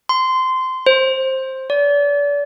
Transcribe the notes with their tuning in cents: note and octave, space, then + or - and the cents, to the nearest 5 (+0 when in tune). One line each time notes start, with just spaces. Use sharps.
C6 -20
C5 +10
D5 -35